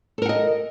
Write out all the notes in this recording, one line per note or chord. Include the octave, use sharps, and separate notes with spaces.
A4 A#4 D#5 F#5